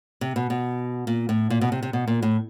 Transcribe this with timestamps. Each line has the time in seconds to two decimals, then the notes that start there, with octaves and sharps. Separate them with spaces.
0.21 C3
0.36 B2
0.50 B2
1.07 A#2
1.29 A2
1.50 A#2
1.61 B2
1.72 C3
1.83 C3
1.93 B2
2.08 A#2
2.22 A2